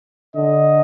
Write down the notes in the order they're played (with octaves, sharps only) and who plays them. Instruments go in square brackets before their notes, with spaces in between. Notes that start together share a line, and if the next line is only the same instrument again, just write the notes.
[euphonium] D3 [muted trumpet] D#5